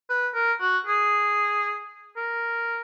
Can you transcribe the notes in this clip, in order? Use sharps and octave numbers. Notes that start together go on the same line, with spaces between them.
B4
A#4
F#4
G#4
A#4